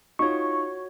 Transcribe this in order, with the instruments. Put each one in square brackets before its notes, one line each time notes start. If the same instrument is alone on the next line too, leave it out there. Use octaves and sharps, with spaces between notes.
[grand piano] D#4 F4 [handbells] F#4 C#5 [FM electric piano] C#6